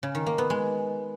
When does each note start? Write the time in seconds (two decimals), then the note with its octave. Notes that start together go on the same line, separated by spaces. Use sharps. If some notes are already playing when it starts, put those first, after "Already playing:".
0.03 C#3
0.15 D#3
0.26 A#3
0.38 B3
0.50 G#3